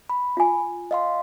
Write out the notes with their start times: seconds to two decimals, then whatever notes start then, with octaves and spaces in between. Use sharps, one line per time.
0.10 B5
0.37 F4 G#5
0.91 D#5 F5 C6